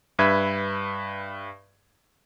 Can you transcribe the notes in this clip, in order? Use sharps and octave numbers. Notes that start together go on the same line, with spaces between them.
G2 B4 E5 G#6